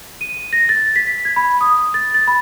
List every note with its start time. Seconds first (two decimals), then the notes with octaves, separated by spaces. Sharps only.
0.21 D#7
0.53 A#6
0.69 A6
0.96 B6
1.25 G#6
1.36 B5
1.61 D#6
1.94 A6
2.14 A6
2.27 B5